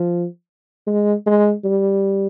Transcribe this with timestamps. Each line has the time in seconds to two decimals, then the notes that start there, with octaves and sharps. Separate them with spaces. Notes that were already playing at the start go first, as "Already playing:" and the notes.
Already playing: F3
0.87 G#3
1.26 G#3
1.64 G3